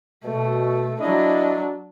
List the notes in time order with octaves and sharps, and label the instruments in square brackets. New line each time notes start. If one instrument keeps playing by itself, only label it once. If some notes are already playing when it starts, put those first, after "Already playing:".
[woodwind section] B2 [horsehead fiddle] A3
[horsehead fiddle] F#3 D4 [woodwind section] E4 D#5